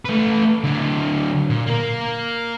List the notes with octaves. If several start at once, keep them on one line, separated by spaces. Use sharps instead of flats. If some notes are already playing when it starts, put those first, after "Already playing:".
A3 B4
D3 F#3
A#2
A#3 A#4